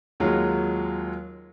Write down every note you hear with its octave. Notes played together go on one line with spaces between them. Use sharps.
D#2 F#3 G#3 F4